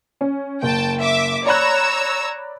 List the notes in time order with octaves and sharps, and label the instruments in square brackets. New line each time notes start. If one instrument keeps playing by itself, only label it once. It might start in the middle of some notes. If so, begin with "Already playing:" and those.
[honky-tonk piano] C#4
[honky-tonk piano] F#1 [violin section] G5 A5
[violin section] E5 D6
[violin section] C#5 A#5 E6 [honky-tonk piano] D5 B5 F#6